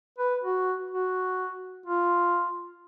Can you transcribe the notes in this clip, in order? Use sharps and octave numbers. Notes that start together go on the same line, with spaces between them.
B4
F#4
F#4
F4